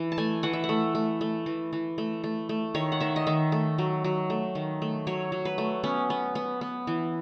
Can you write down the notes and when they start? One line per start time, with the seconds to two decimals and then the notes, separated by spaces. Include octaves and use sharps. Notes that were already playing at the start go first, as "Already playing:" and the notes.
Already playing: E3
0.12 A5
0.18 A3 G#5
0.43 E3 F#5
0.53 E5
0.64 F#5
0.69 A3
0.95 A3
1.21 A3
1.46 E3
1.73 E3
1.98 A3
2.24 A3
2.49 A3
2.74 D#3 C#5
2.92 F#5
3.00 D#3 E5
3.16 D#5
3.27 D#3 E5
3.52 A3
3.78 F#3
4.04 F#3
4.30 A3
4.55 D#3
4.82 A3
5.07 F#3 C#5
5.32 F#3
5.45 B4
5.58 A3
5.84 B3 C#4
6.10 B3
6.35 B3
6.61 B3
6.87 E3